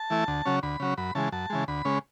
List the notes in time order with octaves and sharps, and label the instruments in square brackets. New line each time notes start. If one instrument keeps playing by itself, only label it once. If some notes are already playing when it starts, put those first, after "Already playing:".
Already playing: [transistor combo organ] A5
E3 A3 E4
D2
C#3 F#3 C#4
D2 B5
C#3 F#3 C#4
F#2 B5
C#3 E3 G#3 A5
F#2 A5
C#3 E3 G#3
D2 B5
C#3 G#3 C#4